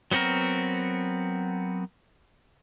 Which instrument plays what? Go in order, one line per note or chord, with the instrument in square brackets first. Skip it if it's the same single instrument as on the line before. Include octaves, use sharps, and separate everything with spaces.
[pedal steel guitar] F#3 B3 C4 F#4 A#4